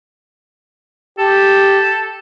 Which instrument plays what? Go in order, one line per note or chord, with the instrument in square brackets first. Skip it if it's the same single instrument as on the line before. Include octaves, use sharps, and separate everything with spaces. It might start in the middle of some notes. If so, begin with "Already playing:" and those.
[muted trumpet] G4 [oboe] A4